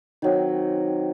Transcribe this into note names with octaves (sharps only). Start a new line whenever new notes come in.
D#3 F#3 C4